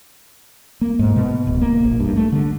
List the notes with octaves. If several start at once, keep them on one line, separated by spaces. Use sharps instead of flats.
A#3
G#2
B2
D1
A#3
A#1
G2
A3
D3